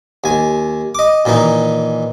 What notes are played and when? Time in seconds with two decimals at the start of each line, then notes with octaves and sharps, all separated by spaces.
0.24 D#2 G#5
0.95 D#5 D6
1.25 A#2 D#3 E3 D#4